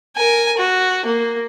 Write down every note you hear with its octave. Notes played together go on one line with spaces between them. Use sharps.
A#4 G#5
F#4
A#3